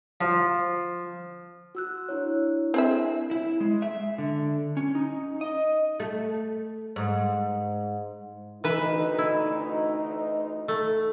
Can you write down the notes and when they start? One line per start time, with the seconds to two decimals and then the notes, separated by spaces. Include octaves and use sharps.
0.21 F3
1.75 F#4 E6 F#6
2.09 D4 E4 C#5
2.74 C4 G#4 E5
3.31 E4
3.60 G#3
3.82 E5
4.18 D3
4.77 C#4
4.95 D#4
5.41 D#5
6.00 A3
6.96 G#2
8.64 D2 E3 D#4 B4 E5
9.19 E4
10.68 A3